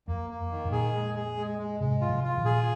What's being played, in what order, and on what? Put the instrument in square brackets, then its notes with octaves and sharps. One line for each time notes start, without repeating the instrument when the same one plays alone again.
[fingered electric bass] F2 [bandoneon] A#3
[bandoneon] A#3
D#3
[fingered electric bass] F2 A#2
[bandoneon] G#4
G#3
G#4
G#3
G#3
[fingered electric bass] G#2 C3 [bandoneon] G#3
[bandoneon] F4
[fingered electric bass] C3 F3
[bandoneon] F4
[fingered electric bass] A#2 D#3
[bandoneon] G#4